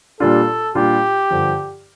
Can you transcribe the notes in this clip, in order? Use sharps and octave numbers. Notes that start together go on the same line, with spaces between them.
A#2 G3 D4 F4 A4
A#2 G3 D4 F4 G4
G2 D3 F3